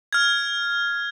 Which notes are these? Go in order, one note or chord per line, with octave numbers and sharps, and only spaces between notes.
F6 G#6